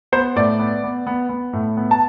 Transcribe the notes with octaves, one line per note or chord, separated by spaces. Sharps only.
B3 C5
A2 D5
B3
B3
B3
B3
A2
B3
A5